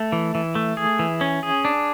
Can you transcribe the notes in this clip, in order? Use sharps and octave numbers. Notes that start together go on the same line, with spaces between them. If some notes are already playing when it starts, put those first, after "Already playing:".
Already playing: A3
E3
E3
A3
G#4
E3
C#4
G#4
D4